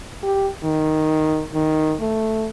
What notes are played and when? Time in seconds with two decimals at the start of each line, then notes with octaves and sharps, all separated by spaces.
0.23 G4
0.64 D#3
1.54 D#3
2.01 A3